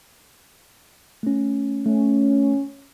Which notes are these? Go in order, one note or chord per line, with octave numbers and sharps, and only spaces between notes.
A3 C#4
A3 C#4